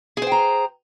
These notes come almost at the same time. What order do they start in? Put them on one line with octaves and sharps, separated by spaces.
G#4 C5 G5 A#5